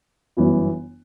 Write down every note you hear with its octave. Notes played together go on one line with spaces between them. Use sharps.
G1 F#2 E3 B3 E4